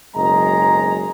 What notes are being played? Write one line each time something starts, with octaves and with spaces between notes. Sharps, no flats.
F#1 B1 G#3 D#5 A#5